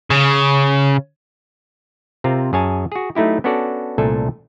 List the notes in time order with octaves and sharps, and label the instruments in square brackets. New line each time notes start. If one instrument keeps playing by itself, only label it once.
[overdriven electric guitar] C#3
[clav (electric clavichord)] C3 C4 F4 A#4
F#2 G#4 C#5 G#5 A5
F#4 G#4
F#3 A3 D#4 E4 G4
B3 C#4 D4 F#4 A4 D5
C2 A#2 A3 D4 A4 G#5